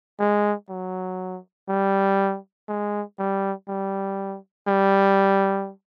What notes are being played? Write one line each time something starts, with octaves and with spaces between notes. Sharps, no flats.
G#3
F#3
G3
G#3
G3
G3
G3